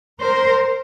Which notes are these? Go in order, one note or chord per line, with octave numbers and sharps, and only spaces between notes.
A#4 C5